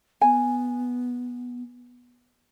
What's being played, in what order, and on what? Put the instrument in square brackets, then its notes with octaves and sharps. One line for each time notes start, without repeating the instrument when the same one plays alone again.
[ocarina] B3 [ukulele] G#5